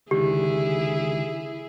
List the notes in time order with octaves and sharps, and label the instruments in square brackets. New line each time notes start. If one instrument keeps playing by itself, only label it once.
[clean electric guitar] C#2 D3 D#3 [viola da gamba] E4 G#4 [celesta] G4